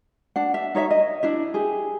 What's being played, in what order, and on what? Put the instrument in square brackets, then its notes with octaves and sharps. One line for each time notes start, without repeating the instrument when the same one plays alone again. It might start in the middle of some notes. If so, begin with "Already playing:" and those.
[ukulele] D4 F#5
E5
D#4 C#5 D#5 E5
D#5
D4 E4 E5
G4 G#4